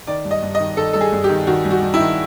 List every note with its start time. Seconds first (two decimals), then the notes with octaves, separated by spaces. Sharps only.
0.07 D#3 D5
0.25 G2
0.31 D#5
0.42 G2
0.55 D#5
0.60 D#3
0.77 D#3 A4
0.93 G2 A4
1.01 G#4
1.12 G2
1.24 G4
1.29 D#3
1.47 D#3 F#4
1.65 G2
1.71 F#4
1.82 G2
1.94 E4
1.99 D#3